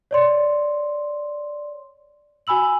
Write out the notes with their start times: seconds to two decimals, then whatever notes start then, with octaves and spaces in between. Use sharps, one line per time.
0.11 C#5 D5 C6
2.47 F#4 G#5 B5 E6 F#7